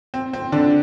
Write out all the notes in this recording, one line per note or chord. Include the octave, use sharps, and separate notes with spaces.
C4
C4
D3 D4